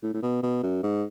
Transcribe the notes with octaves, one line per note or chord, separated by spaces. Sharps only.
A2
A2
B2
B2
F#2
G#2